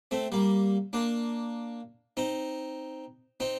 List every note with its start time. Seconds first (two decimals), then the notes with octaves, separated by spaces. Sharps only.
0.11 A3 C4
0.32 G3 A#3
0.93 A#3 D4
2.17 C4 D#4
3.40 C4 D#4